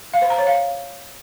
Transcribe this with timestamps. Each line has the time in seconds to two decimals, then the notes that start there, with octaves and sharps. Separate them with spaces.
0.14 F5
0.22 C5
0.30 A#5
0.39 C#5
0.47 F5